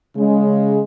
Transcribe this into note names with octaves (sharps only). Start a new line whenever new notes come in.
C#3 G#3